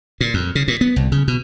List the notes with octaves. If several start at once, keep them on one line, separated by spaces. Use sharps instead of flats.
A#2
F2
C#3
A#2
B3
C2
C#3
B2